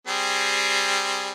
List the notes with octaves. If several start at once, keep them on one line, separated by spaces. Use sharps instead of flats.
G3 C4 G#4